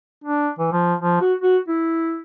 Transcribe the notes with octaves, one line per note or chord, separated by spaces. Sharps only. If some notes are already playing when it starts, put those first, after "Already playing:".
D4
E3
F3
F3
F#4
F#4
E4